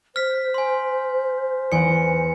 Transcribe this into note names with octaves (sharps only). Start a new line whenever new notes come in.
C5 F6 B6
G#5 C6
E2 F#5 G#5 C#7